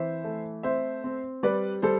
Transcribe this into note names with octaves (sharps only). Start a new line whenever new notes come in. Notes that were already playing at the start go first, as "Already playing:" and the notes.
Already playing: E3 C4 C5 E5
A3
C4 C5 E5
C4
G3 B4 D5
G3 A4 C5